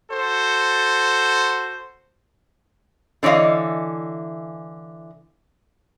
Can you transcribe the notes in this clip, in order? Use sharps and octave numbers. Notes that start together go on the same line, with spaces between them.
F#4 A4 C5
D3 E3 C#5 D#5 F5